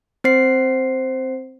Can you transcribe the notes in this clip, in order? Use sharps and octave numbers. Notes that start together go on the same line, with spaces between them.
C4 C5 C7